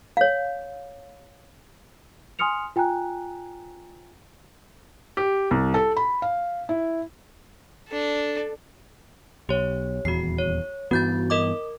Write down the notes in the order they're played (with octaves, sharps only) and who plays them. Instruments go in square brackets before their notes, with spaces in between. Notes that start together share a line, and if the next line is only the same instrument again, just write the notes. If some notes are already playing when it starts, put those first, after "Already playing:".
[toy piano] C#5 F5
[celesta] G#5 C6 D#6 F6 C#7 F7
F4 G5 G#5 A#5 F#6
[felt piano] G4
C2
A4
B5
F5
E4
[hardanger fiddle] D4 A4
[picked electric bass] B1 [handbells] G4 C#5
[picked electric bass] D#1 E2 [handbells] F#4 C7
[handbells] C#5
[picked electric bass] G2 E3 B3 [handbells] F#4 G6 A6
[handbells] A#4 D#5 D6